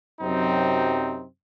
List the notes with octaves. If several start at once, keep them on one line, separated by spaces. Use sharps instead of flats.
F#2 C3 F#3 C4 D#4